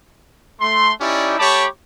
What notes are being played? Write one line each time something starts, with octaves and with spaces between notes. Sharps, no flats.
A3 C6
C#4 D#4 E4 G4 D5
A3 G4 C#5 A5 B5 D6